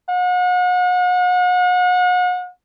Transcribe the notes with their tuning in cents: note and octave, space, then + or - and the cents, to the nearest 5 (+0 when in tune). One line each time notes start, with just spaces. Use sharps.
F#5 -40